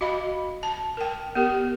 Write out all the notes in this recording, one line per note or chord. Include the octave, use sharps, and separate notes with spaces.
F#4 D#5 F5 B5
A5
A#4 G5
B3 G4 A#4